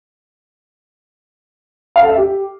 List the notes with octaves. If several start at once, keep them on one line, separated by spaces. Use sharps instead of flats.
F5
A4
E5
G4